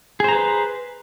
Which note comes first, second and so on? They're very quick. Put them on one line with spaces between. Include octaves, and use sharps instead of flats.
G#4 C5 A#5 B4